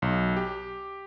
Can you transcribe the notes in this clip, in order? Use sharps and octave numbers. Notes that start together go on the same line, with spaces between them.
B1
G4